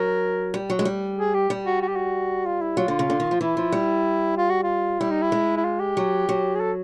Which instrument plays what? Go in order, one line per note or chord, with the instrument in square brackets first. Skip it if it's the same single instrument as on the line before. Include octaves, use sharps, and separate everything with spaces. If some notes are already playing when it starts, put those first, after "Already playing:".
Already playing: [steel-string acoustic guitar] F#3 [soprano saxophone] A#4
[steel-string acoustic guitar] G3
F#3
G#3
G3
[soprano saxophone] G#4
G4
[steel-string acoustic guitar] G3
[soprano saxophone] F#4
F#4
G4
F#4
F4
E4
[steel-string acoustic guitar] F#3 [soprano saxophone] F4
[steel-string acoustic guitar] D3
C#3
D3
D#3
F3
[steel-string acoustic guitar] E3 [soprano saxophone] E4
[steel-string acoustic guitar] F3
G3
[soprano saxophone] F4
F#4
F4
[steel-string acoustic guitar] G3 [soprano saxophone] E4
[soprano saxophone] D#4
E4
[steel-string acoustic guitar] G#3
[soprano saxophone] E4
F4
G4
[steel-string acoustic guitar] F#3
F#3
[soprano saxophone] G#4
A4